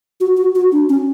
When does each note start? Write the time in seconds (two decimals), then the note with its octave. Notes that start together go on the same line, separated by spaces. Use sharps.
0.20 F#4
0.37 F#4
0.55 F#4
0.72 D4
0.89 C#4